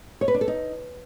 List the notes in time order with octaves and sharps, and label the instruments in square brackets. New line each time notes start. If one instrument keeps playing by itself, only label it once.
[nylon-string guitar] C#5
B4
D4
A4
D#4